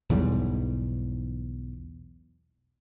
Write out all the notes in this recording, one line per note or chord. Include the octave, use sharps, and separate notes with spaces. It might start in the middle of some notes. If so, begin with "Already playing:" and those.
B1 E2 G#2 G3